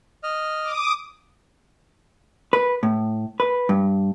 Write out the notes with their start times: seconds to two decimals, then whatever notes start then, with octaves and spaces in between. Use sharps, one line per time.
0.23 D#5 F6
0.64 D6 D#6
2.53 B4
2.83 A2
3.40 B4
3.69 G2